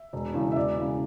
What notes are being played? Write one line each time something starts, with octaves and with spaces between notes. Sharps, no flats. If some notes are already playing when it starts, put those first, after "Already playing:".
Already playing: E5
E1
E2 C#3 E3
E5
E1 D5
C#3 E3